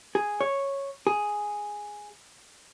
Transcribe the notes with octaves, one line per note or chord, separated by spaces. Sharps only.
G#4
C#5
G#4